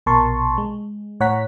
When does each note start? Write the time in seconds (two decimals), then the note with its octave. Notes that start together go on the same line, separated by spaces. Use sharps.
0.06 A#1 B2 A#4 A5 C6 C#6
0.58 G#3
1.20 A2 C#5 F#5 A#5 B6